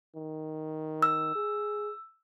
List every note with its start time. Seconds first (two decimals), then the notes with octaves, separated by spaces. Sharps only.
0.16 D#3
1.03 E6
1.36 G#4